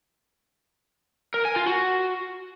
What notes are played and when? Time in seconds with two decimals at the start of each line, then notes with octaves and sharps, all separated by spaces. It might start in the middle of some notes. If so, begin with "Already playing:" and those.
1.34 A#4
1.45 G#5
1.56 F4
1.67 F#4